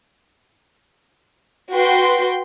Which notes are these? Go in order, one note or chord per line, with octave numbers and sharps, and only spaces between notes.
F#4 B4 G5 C6